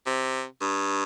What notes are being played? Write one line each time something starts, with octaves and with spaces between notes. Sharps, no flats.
C3
G2